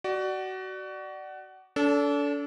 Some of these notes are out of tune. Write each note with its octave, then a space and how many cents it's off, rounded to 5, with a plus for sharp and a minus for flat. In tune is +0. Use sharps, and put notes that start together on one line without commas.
F#4 +25 D5 +15
D4 -35 A4 +0